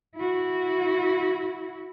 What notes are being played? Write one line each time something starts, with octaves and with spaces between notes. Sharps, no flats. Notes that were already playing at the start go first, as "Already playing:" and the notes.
E4 F#4